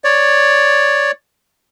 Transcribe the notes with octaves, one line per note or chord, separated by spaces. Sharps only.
C#5 D5